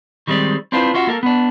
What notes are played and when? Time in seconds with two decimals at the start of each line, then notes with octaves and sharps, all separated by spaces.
0.27 D#3 G3 G#3 C4 D5
0.72 C4 D4 E4 F4 B4 C5
0.94 C#4 F4 F#4 E5
1.07 A#3 A4 A#4
1.23 B3 D4